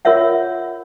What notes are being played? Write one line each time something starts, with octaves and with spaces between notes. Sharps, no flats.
F4 A#4 C#5 E5 F#5